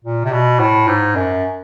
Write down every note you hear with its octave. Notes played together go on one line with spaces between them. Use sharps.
A#2
C3
B2
A2
G#2
F#2